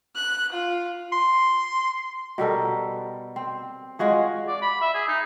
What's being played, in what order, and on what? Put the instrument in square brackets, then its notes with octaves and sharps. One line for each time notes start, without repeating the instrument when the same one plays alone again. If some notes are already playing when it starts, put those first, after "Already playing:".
[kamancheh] F#6
F4
[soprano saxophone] C6
[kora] B2 G3 A4 A#4
C4
G#3 F4 F#4 G#4
[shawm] D5
B5
E5
G#4
D#4